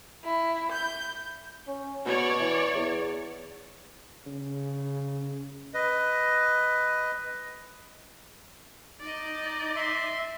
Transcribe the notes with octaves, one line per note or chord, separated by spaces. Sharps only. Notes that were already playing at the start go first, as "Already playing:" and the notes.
E4
G6
C#4
B2 C#5 D5
E3
E2
C#3
B4 D#5
D#4 D5 D#5
E5 C6